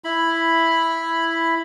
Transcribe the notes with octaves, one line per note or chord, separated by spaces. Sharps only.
E4 B5